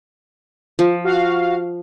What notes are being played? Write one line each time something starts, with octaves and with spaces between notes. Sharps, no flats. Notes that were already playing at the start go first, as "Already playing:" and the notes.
F3
F#4 F5